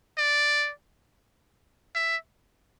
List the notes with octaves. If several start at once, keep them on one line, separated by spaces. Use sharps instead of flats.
D5
E5